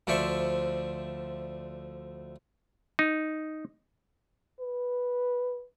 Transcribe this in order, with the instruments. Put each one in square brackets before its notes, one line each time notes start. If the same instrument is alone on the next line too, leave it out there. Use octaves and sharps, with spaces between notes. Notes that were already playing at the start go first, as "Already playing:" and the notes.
[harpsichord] D2 F3 C5 D5 E5 C#6
[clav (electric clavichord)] D#4
[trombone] B4